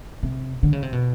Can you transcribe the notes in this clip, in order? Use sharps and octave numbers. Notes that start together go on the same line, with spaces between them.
C3
D3
C#3
C3
B2